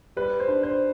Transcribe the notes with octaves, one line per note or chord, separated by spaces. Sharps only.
G3 B4
C5
D4
C5